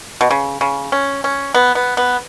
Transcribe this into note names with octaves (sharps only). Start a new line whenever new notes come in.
B2
C#3
C#3
C#4
C#4
B3
B3
B3